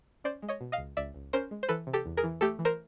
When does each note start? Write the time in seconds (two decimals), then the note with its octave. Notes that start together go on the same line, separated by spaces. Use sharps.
0.24 C#4 C5 D5
0.42 G#3
0.49 C#5 D#5
0.61 B2
0.72 D#5 F5
0.78 C#2
0.97 C#2 D5 E5
1.14 C#2
1.33 C#4 A#4 C5
1.51 G#3
1.63 C5
1.69 E3 A4 B4
1.87 C3
1.93 G4 A4
2.06 E2
2.17 G#4 A#4
2.24 E3
2.41 A3 G4 A4
2.59 E3
2.65 A#4 C5